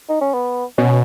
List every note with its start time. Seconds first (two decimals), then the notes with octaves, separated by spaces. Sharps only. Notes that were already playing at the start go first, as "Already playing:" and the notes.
0.09 D#4
0.21 C#4
0.34 B3
0.78 B2 C#4